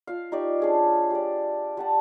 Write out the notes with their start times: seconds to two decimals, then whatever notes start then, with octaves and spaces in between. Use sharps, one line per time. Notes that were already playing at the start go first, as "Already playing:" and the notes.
0.07 F4 F5
0.32 D#4 G4 D5 C#6
0.60 D4 G#4 C#5
1.11 G4 D5
1.77 G3 F#5 A5